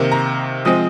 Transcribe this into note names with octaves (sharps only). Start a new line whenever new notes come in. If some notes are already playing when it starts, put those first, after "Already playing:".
Already playing: C3 D#3 A#3
A#5
F3 G#3 C4 D#6